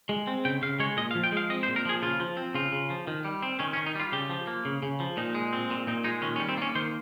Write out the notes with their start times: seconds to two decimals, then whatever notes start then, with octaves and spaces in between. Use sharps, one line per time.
0.09 G#3
0.27 C4
0.45 C#3 G5
0.62 C#3 F5
0.80 G#3 C#5
0.97 A#2 D#5
1.11 F5
1.15 F3
1.24 G5
1.32 G#3 F5
1.50 C4 D#5
1.63 C5
1.68 A#2
1.76 A#4
1.85 F3 G#4
2.02 C#3 F4
2.20 F3
2.37 C4
2.55 C#3 F4
2.72 C#3
2.90 F3
3.07 D#3
3.25 G3
3.42 C4
3.59 D#3 C#4
3.73 C#4
3.77 D#3
3.86 D#4
3.95 G3 F4
4.12 C#3 G4
4.30 F3
4.47 A#3
4.65 C#3
4.83 C#3
5.00 F3
5.17 A#2 D#4
5.35 G#3
5.53 C4
5.71 A#2
5.87 A#2 D#4
6.04 G#3 D#4
6.22 D#3 C#4
6.36 C#4
6.40 G3
6.49 C4
6.57 A#3 C#4
6.75 D#3 C5